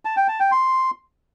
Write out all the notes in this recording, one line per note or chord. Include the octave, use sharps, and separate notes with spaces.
A5
G5
A5
G5
C6